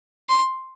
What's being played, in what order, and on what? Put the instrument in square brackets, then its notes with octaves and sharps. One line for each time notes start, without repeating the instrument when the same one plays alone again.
[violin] C6